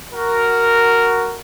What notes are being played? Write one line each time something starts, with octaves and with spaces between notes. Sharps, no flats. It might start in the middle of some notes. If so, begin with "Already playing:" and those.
F#4 A#4